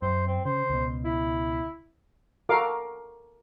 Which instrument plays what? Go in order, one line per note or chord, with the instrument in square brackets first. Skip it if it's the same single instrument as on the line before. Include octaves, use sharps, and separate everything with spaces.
[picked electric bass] F#2 [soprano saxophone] C5
[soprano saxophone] C4
[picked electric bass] C#3 [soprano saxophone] C5
[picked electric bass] C#2 B2
[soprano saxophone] E4
[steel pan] F#4 A4 A#4 F5 D6